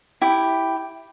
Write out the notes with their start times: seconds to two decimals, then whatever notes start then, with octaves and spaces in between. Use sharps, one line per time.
0.22 E4 G4